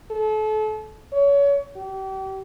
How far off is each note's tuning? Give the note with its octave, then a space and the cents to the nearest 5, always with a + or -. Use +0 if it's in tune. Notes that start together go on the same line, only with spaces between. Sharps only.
A4 -35
C#5 +30
G4 -35